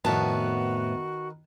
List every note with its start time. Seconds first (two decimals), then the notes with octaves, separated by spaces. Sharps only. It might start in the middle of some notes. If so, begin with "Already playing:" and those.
0.05 F2 A2 D#3 B3 F#4 B4 A5